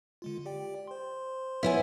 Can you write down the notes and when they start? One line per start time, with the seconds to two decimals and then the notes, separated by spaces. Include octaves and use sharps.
0.22 D3 G#3 F4
0.46 G4 D5 G5
0.87 C5 C6
1.63 B3 E4 C#5 E5 G#5